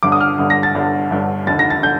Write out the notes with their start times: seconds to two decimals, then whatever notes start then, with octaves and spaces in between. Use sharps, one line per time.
0.03 G1 G2 D3 D6
0.12 D#6
0.21 F6
0.38 G1 G2 D3
0.50 A#6
0.63 A6
0.75 G1 G2 D3
1.10 G1 G2 D3
1.46 F1 D#2 D3 A6
1.59 A#6
1.70 A6
1.83 D3 G6